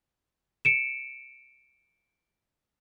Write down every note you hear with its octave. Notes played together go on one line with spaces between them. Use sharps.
C#7 D7 E7